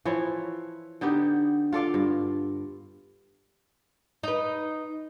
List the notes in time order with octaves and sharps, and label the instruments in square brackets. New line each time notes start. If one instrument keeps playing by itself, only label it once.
[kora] E3 F3 E4 C#5
D3 B3 D#4 G4
F4 A4 D5 F5
G2
[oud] D#4 B4